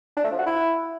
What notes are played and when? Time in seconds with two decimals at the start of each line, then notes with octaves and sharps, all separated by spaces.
0.17 D4
0.24 A3
0.31 F3
0.39 F#4
0.46 E4